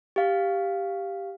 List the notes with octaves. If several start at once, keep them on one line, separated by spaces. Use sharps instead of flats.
G4 F5